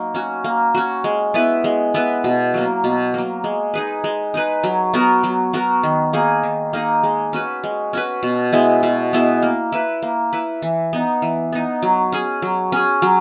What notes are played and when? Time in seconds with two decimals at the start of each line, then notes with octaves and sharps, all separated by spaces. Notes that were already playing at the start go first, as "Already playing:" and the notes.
Already playing: F#3 A#3 D#4
0.14 C#4 F#4
0.44 A#3
0.75 C#4 F#4
1.04 G#3
1.34 B3 E4 B4
1.64 G#3
1.94 B3 E4 B4
2.24 B2
2.54 F#3 A#3
2.84 B2
3.14 F#3 A#3
3.44 G#3
3.74 D#4 G#4 B4
4.04 G#3
4.34 D#4 G#4 B4
4.64 F#3
4.94 B3 F#4 A#4
5.23 F#3
5.53 B3 F#4 A#4
5.83 D#3
6.13 A#3 D#4 G#4
6.43 D#3
6.73 A#3 D#4 G#4
7.03 G#3
7.33 C#4 F#4 B4
7.64 G#3
7.93 C#4 F#4 B4
8.23 B2
8.52 G#3 B3 E4
8.83 B2
9.13 G#3 B3 E4
9.42 A#3
9.72 E4 B4
10.02 A#3
10.33 E4 B4
10.62 E3
10.93 B3 D#4
11.22 E3
11.52 B3 D#4
11.82 F#3
12.12 C#4 G#4
12.42 F#3
12.72 C#4 G#4
13.02 F#3